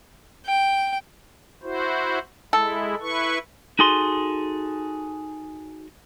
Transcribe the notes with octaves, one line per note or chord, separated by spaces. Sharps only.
G5
E4 F#4 C5
G#3 E4 A4
E4 B4 C#6
D#4 F#4 G#4 A4 C6